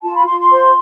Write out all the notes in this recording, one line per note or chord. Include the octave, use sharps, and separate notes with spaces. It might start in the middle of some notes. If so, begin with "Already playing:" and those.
F4 A5
B5
F4 C6
C6
C5